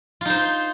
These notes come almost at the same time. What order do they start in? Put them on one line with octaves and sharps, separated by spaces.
F4 D#4 C5